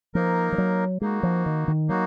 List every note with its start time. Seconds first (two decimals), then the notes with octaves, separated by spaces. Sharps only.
0.15 F3 A#3 D#4 A#4
0.52 F3
0.58 F#3
1.01 G#3 A#3 D#4 F#4
1.23 F3
1.46 D#3
1.68 D#3
1.88 F#3 A#3 D#4 F#4